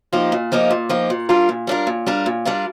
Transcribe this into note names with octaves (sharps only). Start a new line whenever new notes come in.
F3 A#3 D#4 G4
A#2
F3 A#3 D#4 G4
A#2
F3 A#3 D#4 G4
A#2
G3 D4 F4 A#4
A#2
G3 D4 F4 A#4
A#2
G3 D4 F4 A#4
A#2
G3 D4 F4 A#4